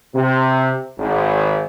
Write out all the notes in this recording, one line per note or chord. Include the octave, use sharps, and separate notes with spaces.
C3
G#1